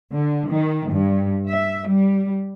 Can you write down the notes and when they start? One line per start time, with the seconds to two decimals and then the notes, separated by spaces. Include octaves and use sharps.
0.13 D3
0.51 D#3
0.91 G2
1.49 E5
1.88 G3